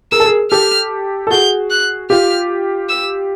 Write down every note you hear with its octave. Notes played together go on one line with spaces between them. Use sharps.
G#4 A#4 E6
A4
G#4 A#4
G4 A4 F6
A4
F#4 G#4 G6
F#6
F4 G4 F6
E6